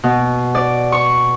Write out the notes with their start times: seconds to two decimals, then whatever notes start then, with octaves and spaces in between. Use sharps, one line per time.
0.04 B2
0.55 D5
0.92 C#6